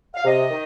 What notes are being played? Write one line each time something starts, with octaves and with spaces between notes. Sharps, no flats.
F5
C3 D#5
D#3